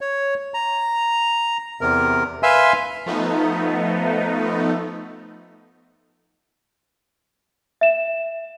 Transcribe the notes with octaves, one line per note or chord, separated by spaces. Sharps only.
C#5
A#5
E2 C3 A#4
B4 E5 F5 G#5 C6 E6
F3 A3 B3 D#4
E5 E7